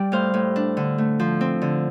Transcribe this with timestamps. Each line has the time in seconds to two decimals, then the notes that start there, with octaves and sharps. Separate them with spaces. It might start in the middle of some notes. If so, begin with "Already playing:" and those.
Already playing: G3 D5 G5
0.12 A2 C5 F5
0.34 A2
0.56 D4
0.77 D3
0.98 A3
1.19 F3
1.41 C4
1.62 D3